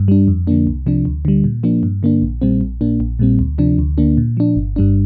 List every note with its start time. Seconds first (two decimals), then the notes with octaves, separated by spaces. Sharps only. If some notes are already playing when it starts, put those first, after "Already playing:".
Already playing: G2
0.08 G3 D4
0.28 F2
0.47 D3 F3 A#3 D4
0.67 C2
0.86 C3 F3 D4
1.05 D2
1.25 D3 G3
1.44 A#2
1.63 F3 A#3 D4
1.83 G2
2.03 D3 A#3 D4
2.22 A#1
2.42 A#2 G3 C4
2.61 A#1
2.81 A#2 A#3 D4
3.00 A#1
3.19 A#2 G3 C4
3.39 D2
3.58 C3 F3 D4
3.78 D2
3.98 D3 A#3 D4
4.17 A#2
4.37 F3 D4
4.56 G1
4.76 G2 G3 D4